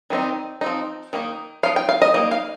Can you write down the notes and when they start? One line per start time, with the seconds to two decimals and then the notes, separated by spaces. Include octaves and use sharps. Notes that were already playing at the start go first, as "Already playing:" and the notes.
0.10 D#3 G3 C4 D#4
0.61 F3 C4 D#4
1.13 D#3 A#3 D#4
1.63 F3 D#4 F5
1.76 G5
1.89 F5
2.02 D#5
2.14 G3 A#3 D#4 D#5
2.31 F5